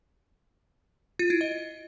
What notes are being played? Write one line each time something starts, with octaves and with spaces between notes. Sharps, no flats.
F4
E4
D#5